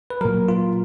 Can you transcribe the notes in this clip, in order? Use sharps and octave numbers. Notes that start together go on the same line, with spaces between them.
B4
A#2 F#3 A#4
F4